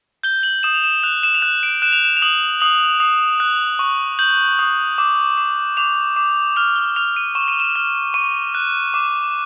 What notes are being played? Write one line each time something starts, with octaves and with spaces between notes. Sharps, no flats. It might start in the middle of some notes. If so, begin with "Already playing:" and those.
G6 G7
F#7
D#6 E7
F7
E7
F#6 F7
E7
F7
F#6 E7
D7
F#6 E7
F7
E7
F7
D#6 F#7
D#6 F#7
D#6
F#6
C#6
G6 F#7
D#6
D6
D6
D6 F7
D6
F6 F7
G7
F6 F7
D#7
C#6 E7
D#7
E7
F6
C#6 D#7
F#6
D6